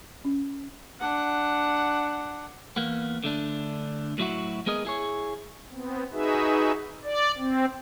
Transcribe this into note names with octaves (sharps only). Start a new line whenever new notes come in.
C#4
D4 F#5
E2 A#3 B3
D3 A3 D4
A2 F#3 E4 F#4
G#3 B3 G#4 A#4 D#5
E4 G#4 C#5
B3 C4
D#4 F#4 G#4 B4 E5
D5
C4